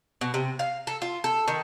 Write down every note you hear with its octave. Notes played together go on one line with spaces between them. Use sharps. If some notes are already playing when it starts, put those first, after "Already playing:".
B2
C3
F5
A4
F4
A4
D#3